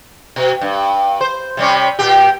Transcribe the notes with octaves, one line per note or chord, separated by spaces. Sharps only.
B2
G2
C5
C3 G3 C#4
A#2 G4